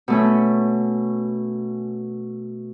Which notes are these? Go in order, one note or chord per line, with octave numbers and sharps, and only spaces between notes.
B2 A3 C#4